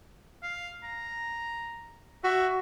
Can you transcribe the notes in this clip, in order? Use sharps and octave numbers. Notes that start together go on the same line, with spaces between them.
F5
A#5
F#4 E5